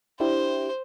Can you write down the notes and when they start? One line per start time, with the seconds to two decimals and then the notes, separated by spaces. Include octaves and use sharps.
0.20 D4 E4 G4 C5